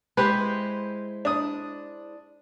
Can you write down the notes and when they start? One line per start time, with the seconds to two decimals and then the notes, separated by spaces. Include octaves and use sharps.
0.17 G#3 E4 G4 B4 C5
1.25 D4 D#6